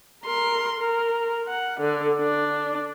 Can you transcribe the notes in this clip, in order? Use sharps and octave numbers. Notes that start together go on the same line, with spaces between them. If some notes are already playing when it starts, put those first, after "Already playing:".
A#4 C6
A#4
F#5
D3
D4